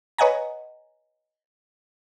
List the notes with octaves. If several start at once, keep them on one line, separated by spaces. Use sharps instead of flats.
B4 C#5 D#5 F#5 G#5 A#5